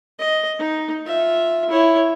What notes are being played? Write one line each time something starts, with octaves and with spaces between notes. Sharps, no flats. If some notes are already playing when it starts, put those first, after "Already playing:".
D#5
D#4
F4 E5
E4 C#5